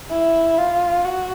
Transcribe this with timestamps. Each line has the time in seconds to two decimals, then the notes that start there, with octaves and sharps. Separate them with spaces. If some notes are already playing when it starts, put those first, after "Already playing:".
0.10 E4
0.57 F4
1.04 F#4